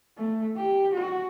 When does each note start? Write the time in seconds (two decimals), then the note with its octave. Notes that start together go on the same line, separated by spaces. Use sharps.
0.18 A3
0.57 G4
0.94 F#4